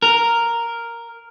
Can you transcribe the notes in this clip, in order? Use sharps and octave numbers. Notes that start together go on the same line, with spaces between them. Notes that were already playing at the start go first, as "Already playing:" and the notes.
A#4